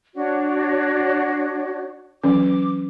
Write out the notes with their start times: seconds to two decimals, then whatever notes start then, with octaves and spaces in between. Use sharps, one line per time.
0.15 D4 F#4 C#5
2.24 E3 F#3 C#4 D6